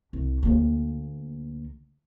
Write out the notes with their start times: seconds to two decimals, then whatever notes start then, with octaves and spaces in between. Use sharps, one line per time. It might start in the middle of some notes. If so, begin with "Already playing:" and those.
0.13 C2
0.43 D2 A#3